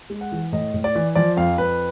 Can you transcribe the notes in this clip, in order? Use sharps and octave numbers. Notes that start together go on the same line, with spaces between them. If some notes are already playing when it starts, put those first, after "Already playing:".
G#3
F#5
E3
A2 D#5
A2
D5
E3
F3 D5
F2 F5
F2 B4